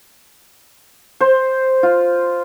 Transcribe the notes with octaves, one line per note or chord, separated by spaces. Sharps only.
C5
F4